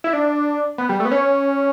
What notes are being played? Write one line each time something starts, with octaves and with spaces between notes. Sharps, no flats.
E4
D4
B3
G3
A3
B3
C#4